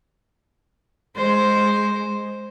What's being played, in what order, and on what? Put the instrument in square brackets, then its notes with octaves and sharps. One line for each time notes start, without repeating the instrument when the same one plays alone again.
[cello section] G#3 [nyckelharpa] C5